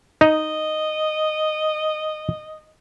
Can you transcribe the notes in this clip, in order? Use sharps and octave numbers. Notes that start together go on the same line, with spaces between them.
D#4 D#5